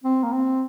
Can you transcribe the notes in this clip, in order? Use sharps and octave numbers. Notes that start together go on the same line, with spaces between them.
C4
A#3
C4